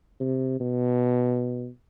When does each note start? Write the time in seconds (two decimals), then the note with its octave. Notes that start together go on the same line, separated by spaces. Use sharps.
0.20 C3
0.60 B2